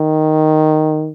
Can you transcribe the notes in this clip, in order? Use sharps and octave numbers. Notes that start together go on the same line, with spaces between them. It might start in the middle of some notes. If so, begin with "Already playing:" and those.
Already playing: D#3